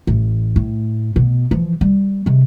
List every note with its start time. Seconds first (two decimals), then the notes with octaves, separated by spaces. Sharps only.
0.07 A1
0.56 A2
1.16 B2
1.51 E3 F3
1.81 G3
2.26 C3 G#3